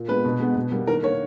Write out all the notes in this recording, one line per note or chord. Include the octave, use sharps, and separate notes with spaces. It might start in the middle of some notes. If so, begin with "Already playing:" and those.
Already playing: A#2
G#3 B3 B4
B2
G#3 B3
B2
G3 A#3
D#3 A#4
A#3 C#5